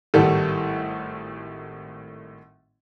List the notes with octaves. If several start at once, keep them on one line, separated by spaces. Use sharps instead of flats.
G#1 A2 D#3 G3 A4